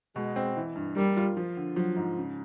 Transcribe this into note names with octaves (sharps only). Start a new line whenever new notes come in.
B2 G#3
C4
E3
G2
G3 A#3
F4
F3
D3
F3 F#3
G#2
C#3